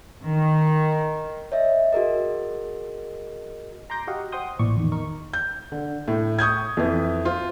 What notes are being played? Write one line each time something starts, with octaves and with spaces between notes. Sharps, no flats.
D#3
C#5 D#5 E5
F#4 G#4 A#4 D#5
A#5 C6 D6 G6 A#6
F#4 G4 D#5 F5 F#5
C5 F#5 G5 C6 D#6 G6
A1 A#2 E3 D5 C#6
E2 D#3
D#4 A#4 C#6
G6
D3
A2
C#6 D#6 G6 G#6
F2 E3
F4 C5